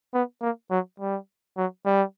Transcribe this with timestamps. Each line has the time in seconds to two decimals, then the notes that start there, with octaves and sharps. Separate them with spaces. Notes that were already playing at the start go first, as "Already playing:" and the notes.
0.14 B3
0.42 A#3
0.71 F#3
1.00 G3
1.57 F#3
1.86 G3